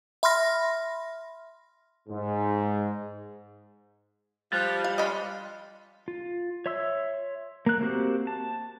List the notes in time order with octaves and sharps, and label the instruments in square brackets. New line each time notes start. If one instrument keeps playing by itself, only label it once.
[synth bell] E5 B5 C6 F6 A#6
[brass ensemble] G#2
[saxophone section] F3 [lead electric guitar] G3 [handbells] F#6 A6
[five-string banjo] F5
[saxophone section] C#4 D4 F4 [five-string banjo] D#5 B5
[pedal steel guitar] F4
C#5 E5 C6 E6
A#3 F#6
A#3 C4 F#4 G4
A5